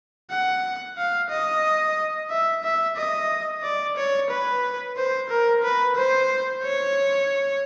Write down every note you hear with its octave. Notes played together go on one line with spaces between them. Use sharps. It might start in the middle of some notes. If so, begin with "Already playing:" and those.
F#5
F5
D#5
E5
E5
D#5
D5
C#5
B4
C5
A#4
B4
C5
C#5